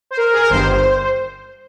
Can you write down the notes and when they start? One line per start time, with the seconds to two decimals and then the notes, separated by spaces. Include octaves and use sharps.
0.11 C5
0.17 A#4
0.33 G#4
0.42 A#4
0.50 G1 G2 D#3 C5